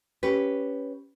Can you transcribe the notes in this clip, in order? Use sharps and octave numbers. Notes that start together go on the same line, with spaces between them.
C#4 G4 B4